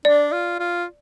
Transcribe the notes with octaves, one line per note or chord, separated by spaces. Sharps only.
D4 D5
F4
F4